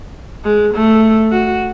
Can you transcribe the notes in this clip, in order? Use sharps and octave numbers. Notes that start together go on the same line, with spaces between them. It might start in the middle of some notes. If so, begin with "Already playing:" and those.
G#3
A3
F#4